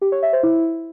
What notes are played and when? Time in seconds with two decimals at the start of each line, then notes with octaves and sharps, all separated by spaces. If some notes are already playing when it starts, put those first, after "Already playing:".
0.02 G4
0.12 C#5
0.22 E5
0.33 C5
0.43 E4